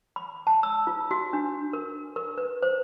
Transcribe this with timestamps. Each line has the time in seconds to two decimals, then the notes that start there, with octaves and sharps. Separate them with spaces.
0.16 B5
0.47 A5
0.63 E6
0.87 F4
1.11 F#4
1.33 D4
1.73 A#4
2.16 A#4
2.38 B4
2.63 C5